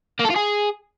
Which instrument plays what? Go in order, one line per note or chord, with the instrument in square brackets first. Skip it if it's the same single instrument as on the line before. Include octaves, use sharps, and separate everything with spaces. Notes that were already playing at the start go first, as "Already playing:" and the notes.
[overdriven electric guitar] A#3
A4
F4
G#4